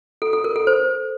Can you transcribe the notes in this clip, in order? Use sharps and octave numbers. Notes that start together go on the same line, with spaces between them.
A4
A4
A#4
A4
C5